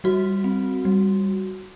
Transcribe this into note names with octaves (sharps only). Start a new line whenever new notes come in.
G3 F#4
C4
G3